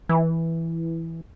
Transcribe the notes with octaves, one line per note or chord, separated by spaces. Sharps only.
E3